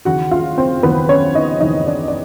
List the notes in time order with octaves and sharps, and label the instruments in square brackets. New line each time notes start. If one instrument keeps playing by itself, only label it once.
[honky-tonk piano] D#2 C#3 E3 F#4 F#5
F4 F5
C4 C5
D#2 C#3 E3 B3 B4
C#4 C#5
D#4 D#5
D#2 C#3 E3 D#4 D#5
D4 D5
D5